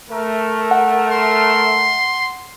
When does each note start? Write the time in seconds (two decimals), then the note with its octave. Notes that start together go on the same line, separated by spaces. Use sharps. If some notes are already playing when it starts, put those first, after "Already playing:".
0.11 A3 A#4
0.71 F#5
1.11 C6